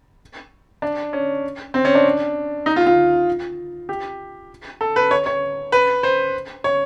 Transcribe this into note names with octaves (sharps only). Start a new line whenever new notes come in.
D4
C#4
C4
C#4
D4
D#4
F4
F4
G4
A4
B4
C#5
C#5
B4
C5
C#5